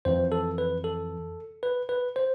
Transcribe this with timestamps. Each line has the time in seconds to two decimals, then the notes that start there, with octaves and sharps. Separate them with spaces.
0.05 F2 E3 C5
0.32 A4
0.58 B4
0.84 A4
1.63 B4
1.89 B4
2.16 C5